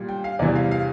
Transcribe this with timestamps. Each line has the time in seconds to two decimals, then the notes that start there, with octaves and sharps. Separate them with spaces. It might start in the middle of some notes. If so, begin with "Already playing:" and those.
Already playing: A#2 G3
0.09 G5
0.24 F5
0.39 E2 C3 E3 G3 D5
0.55 F5
0.71 F5